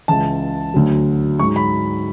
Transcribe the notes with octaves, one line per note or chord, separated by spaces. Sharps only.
C#2 C#3 E3 A5
D2 D3 F#3
G#2 F#3 C#6
B5